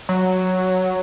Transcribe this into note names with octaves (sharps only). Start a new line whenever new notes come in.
F#3